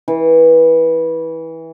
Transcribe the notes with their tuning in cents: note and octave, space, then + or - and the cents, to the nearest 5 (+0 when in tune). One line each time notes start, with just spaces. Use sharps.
E3 -20